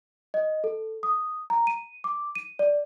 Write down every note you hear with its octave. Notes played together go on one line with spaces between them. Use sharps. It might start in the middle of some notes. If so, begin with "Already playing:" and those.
D#5
A4
D#6
A#5
D#7
D6
D#7
D5